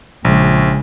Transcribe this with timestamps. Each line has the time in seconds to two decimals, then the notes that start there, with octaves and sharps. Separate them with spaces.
0.25 A#1 C#3 G#3